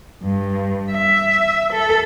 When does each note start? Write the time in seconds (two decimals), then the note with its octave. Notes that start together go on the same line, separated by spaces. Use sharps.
0.24 G2
0.91 E5
1.73 A4